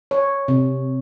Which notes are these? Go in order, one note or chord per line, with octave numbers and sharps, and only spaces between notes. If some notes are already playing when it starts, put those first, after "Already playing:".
C#5
C3